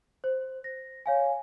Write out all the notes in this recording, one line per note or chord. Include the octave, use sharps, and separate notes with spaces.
C5
A#6
C#5 F5 G#5